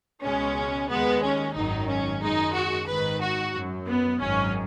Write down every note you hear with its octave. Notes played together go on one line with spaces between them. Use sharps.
C#2 B2 G#3 C#4
D#2 D#3 G#3 B3
C#4
G#1 F#2 D#3 F#3 D#4
C#4
F#2 D#3 G#3 D#4
F#4
G#1 G#2 D#3 B4
F#4
F#2 F#3
B3
G#1 F#2 D#3 C#4